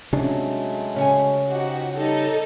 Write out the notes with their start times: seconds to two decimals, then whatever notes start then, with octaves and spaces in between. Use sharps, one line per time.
0.13 C3 F#3 G#3 A3 C#4 D4
0.96 C#3 C#5 G#5
1.47 F3 D#4 F#4 G4
1.95 G3 D#4 G4 A4